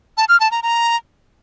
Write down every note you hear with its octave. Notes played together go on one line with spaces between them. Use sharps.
A5
F6
A5
A#5
A#5